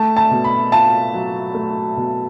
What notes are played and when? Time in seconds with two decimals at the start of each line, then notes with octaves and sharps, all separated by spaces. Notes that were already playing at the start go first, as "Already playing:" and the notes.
Already playing: A3 A5
0.17 A5
0.31 B2
0.44 B5
0.72 F4 A5
1.14 F#3
1.55 A3
1.97 B2